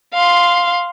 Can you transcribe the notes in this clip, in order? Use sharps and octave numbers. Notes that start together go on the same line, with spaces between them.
F5 C6